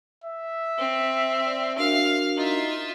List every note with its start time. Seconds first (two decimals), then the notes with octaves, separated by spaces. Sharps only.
0.24 E5
0.78 C4
1.47 D5
1.78 D4 F#4 A#4 F5
2.37 D#4 F4 E5